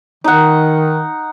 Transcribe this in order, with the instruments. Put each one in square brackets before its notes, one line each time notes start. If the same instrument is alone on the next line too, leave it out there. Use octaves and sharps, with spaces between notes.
[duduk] D#3 [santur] D#4 F#5